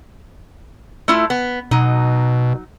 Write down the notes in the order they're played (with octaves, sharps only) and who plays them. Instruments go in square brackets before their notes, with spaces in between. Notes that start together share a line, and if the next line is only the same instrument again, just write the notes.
[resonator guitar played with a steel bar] A3 E4 F4
B3
[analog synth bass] B2 [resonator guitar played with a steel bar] F#3 D#4